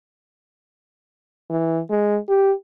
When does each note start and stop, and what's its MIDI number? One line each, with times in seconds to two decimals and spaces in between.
1.50 1.80 52
1.90 2.18 56
2.29 2.52 67